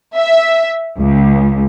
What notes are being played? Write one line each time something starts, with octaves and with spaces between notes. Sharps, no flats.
E5
C#2